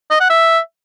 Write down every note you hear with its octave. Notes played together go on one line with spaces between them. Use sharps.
D#5
F#5
E5